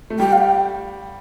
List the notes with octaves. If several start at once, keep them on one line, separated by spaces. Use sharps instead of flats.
A3
G3 G5
F5
G5